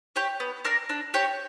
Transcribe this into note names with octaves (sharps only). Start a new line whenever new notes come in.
G4 C#5 G5
B3
D4 A#4 D5
D4
G4 C#5